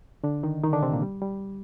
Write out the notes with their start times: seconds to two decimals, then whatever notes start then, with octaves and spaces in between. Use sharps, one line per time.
0.24 D3 D4
0.43 D#3 D#4
0.63 D#3 D#4
0.73 D3 D4
0.82 C3 C4
0.92 A#2 A#3
1.02 G3
1.22 G3